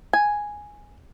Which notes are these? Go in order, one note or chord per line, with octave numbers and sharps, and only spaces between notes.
G#5